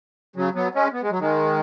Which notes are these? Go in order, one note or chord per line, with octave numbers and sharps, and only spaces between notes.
C#3 F#3
F#3 B3
G#3 C#4
B3
G#3
F#3
D#3 G#3